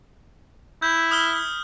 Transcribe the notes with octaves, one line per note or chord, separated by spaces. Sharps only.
E4 G6
D#6 F6 G7